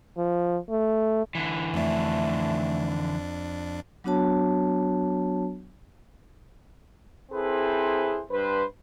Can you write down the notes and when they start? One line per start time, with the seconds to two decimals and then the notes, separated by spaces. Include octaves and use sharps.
0.18 F3
0.70 A3
1.35 D3 E3
1.73 F2 A3 D4
4.04 F#3 B3 D4 F#4 C#5 A5
7.32 C4 E4 G#4 A4 B4 C5
8.31 G2 B4 C5